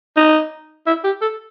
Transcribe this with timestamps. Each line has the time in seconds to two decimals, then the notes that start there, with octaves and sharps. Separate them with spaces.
0.17 D#4
0.87 E4
1.04 G4
1.22 A4